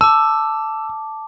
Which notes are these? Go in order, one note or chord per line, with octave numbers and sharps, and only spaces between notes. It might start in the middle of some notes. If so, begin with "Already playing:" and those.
A5 D6 E6